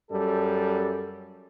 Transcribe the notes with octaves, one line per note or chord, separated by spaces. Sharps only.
F#2 G3 A4